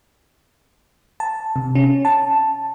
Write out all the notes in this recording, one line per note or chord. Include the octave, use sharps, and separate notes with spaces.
A5
C3
C#4
A5